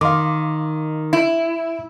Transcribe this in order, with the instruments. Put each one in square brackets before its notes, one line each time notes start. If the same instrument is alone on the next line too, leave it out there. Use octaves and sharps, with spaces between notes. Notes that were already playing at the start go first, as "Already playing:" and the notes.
[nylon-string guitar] D#3 [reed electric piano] F5 C6 D6
[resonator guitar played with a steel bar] E4